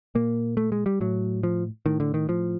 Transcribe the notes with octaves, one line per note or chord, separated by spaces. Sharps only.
A#2 A#3
A3
G#3
G3
A2 F#3
F3
A2 D#3
D3
D#3
F3